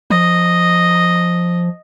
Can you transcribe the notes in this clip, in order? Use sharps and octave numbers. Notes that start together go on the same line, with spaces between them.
F3 D#5